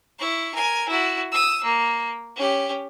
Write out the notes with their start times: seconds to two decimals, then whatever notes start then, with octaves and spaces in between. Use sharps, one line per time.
0.19 E4 C#6
0.54 A#4 G#5
0.88 E4 F#4
1.32 D#6 E6
1.64 A#3
2.36 C#4 G4